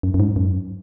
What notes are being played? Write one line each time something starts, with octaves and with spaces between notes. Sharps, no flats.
F#2
F#2
G#2
F#2